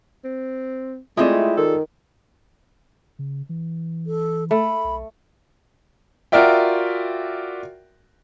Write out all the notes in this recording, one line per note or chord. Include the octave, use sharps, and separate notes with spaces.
C4
G#3 A3 C4 E4 F4 G#4 D5 D#5
D#3 A4
C#3
E3
A4
A3 B5
B1
F4 F#4 A#4 D5 E5 G5